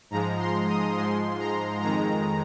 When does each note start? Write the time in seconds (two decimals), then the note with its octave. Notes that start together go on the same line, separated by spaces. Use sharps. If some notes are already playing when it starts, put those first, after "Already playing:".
0.10 G#2 F3 G#3 A#5
0.39 C6
0.68 D#6
0.97 G#2 F3 G#3 C6
1.39 A#5
1.82 F2 D#3 G#3 A#5